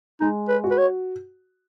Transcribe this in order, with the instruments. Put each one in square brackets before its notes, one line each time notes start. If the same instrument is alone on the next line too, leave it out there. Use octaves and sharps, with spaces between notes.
[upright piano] G#3 [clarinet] D#4
[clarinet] B4
[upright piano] F#4
[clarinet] B4
C#5